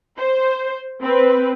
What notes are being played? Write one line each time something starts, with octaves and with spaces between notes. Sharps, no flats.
C5
C4 B4